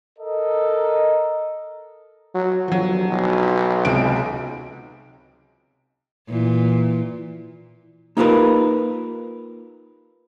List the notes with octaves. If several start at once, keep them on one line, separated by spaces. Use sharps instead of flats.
A4 A#4 D#5
F#3
G1 F3 F#3
B1
C#2 C3 D7
A#2 E3
A#3 D#4 F4 G4 A#4 B4